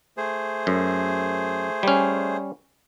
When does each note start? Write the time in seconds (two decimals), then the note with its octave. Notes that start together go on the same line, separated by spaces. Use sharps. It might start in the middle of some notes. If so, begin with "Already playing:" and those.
0.17 A3 G#4 C5
0.67 F#2
1.83 G3 C#4